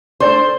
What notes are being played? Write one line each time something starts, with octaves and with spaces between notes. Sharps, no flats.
A3 D4 A4 C5 D5